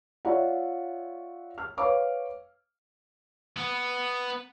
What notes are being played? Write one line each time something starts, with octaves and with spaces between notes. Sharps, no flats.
F4 C#5 D5 E5 F#5
F6
B4 C#5 F5 D6
B3